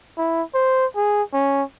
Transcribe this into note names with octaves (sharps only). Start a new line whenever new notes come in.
E4
C5
G#4
C#4